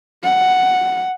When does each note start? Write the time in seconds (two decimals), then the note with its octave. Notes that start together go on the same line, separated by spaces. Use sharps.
0.23 F#5